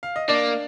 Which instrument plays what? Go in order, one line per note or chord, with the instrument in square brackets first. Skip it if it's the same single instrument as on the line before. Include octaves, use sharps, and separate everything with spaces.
[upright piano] F5
D#5
[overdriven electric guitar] A#3 [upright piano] D4 D5